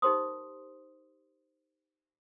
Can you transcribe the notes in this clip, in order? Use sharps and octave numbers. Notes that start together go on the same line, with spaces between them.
D#4 G4 A#4 C5 C6 D#6